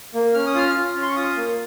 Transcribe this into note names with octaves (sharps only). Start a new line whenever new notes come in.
A#3
C#4 F6
D#6
F4 F6
F4
C#4
C6
C#6
F4 D#6
A#3